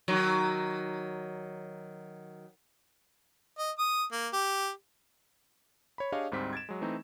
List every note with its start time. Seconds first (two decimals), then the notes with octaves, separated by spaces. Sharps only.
0.08 D#3 F#3
3.59 D#5
3.79 D#6
4.12 A#3
4.33 G4
5.98 C#5 B5
6.12 D4 G4 G#4 C#5 D#5 F5
6.31 D2 G#2 G3 C4 B6
6.53 G#6 A6 D7 E7
6.69 F#3 G#3
6.81 E3 A3 C4 D#4